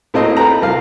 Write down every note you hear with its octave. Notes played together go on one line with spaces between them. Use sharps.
A2 A3 A#3 C4 C5 D#5
A4 B4 G5 A#5
C2 F5